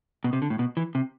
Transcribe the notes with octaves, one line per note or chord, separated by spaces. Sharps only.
B2
C3
D3
A2
B2
E3
C3